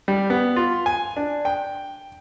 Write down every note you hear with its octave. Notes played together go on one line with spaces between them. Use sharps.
G3
B3
F4
G#5
D4
G5